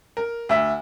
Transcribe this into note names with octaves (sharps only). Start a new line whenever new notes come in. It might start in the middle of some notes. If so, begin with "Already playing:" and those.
A#4
D2 E5